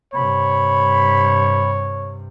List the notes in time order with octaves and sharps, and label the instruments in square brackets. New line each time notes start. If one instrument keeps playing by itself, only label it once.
[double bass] G2 C3 [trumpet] C#5 [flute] B5